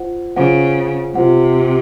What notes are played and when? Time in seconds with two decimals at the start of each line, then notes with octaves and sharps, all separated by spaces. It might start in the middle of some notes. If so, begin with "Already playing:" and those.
Already playing: F4 C5 F#5
0.36 C#3 F4 C5 F#5
1.15 C3 F4 C5 F#5